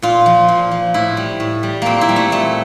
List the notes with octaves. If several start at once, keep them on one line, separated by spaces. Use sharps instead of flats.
A#2 F4
F3
A#2
F3
A2 E4
G3
A2
G3
A#2 A#3 C4
E4
G3
A3
A#2 A3